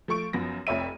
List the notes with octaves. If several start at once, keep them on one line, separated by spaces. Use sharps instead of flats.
F3 A3 C#6 D7
F#2 F3 B3 A#6
F1 F2 C#5 E5 D#7